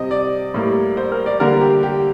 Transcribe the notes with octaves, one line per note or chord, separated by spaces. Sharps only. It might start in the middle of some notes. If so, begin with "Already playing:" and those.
Already playing: C3 G3 C4 D#5
D5
A2 G3 A#3
C5
A#4
D5
D3 G3 A#3 A#4
G4
G4